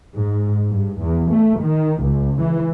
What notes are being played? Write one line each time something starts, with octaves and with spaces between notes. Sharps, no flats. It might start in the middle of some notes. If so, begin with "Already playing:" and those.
G#2
G2
E2
A3
D#3
C#2
E3